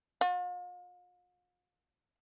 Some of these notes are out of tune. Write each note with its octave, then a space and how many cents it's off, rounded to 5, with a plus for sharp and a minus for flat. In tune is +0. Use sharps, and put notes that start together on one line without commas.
F4 +45